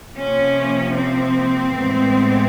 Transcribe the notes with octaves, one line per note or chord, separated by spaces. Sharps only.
C3 F3 A#3 C#4
C4
A2 E3 G#3 B3